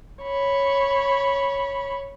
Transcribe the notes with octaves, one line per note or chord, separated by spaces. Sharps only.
C#5 B5